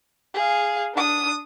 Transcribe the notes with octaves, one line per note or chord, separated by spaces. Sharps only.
G#4 F5
D4 D#6